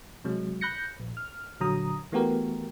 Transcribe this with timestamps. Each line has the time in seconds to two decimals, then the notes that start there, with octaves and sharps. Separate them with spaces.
0.24 C3 F#3 G#3
0.61 B5 F#6 G6 A#6 C#7
1.00 A#1
1.17 F6
1.60 A#1 D3 F#3 A#5 D#6
2.12 E3 A3 B3 F#4 G4 A#4